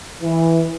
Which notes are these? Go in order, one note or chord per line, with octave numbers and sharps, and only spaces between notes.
E3